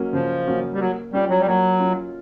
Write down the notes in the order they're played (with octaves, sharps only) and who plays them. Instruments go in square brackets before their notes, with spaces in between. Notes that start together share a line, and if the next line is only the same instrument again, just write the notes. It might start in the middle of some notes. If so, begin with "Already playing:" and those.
Already playing: [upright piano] F#3 A#3 C#4
[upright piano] C#3 [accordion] F3
[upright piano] F#3 A#3 C#4
[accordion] G3
[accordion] F#3 [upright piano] A#3
[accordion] G3 [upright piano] C#4 F4
[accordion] F#3
G3
[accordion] F#3 [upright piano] A#3
[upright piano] C#4 F4